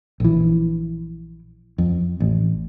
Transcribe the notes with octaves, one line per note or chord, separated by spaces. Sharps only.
A#1 E3
F2
A1